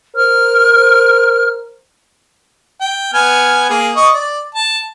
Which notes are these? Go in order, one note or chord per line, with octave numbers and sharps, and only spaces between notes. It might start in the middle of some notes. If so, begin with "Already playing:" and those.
A#4 C5 F6
G5
B3 G#5 F6
A#3 G#4
D#5 C#6
D5
A5